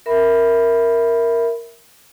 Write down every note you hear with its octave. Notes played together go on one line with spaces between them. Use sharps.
A#4 E5 B5